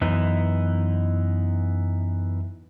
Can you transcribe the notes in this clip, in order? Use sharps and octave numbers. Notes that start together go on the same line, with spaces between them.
F#2 E3 B3 D#4